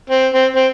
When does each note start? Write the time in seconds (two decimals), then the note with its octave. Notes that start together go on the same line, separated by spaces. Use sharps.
0.10 C4
0.34 C4
0.56 C4